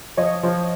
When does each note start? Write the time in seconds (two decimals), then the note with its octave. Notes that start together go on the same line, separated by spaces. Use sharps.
0.17 F3 C#5 D#5
0.43 F3